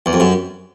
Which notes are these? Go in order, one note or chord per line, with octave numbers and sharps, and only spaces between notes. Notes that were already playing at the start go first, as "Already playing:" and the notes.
E2
F2
F#2